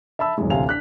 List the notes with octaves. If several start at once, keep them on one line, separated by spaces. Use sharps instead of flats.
E5 A5 B5 E6
D#1 F#2 E3 G#3
A1 D2 C3 F5 G#5 F7
D4 F#6 B6